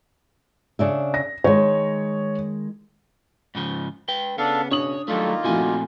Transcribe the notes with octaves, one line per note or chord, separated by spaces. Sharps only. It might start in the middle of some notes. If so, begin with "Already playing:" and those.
C#3 D4 E5
A#6
D#3 G#3 C#5
G#2 C#3 F3
B4 G5
C#3 B3 D4 A4 F5
B2 D4 C#5 D#6 F#7
D#3 F#3 G3 A3 A#3 F4 A4
A#2 F3 A3 C4 E4 F#4 G#5